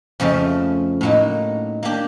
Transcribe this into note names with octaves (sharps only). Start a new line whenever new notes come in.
F2 C#3 F3 A3
A2 F#3 A#3 D#4
A#3 D4 G4